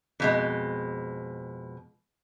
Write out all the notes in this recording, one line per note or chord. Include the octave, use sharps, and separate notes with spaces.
F2 B2 G#3